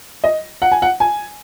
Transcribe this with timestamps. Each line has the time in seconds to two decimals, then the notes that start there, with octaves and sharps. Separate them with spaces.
0.24 D#5
0.62 F#5
0.72 G#5
0.82 F#5
1.00 G#5